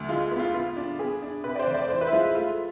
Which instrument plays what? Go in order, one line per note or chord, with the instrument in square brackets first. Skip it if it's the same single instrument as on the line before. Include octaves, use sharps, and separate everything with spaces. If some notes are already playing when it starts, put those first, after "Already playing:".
Already playing: [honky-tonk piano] D2
G#3 F4
B3
F4
B3 F4
D4
B3 G#4
D4
C3 B4
D5
C5
F1
D5
E3 C5
B4
E4
G#3 F4
E4
A3 F4